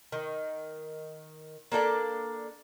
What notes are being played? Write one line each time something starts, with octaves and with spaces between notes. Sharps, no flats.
D#3
A#3 D4 A4 D5